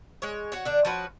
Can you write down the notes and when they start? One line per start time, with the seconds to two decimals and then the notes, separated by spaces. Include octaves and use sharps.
0.22 G#3 C#5
0.52 F#4 C#5
0.65 D3 D4
0.85 F3 C#4 F#4 B4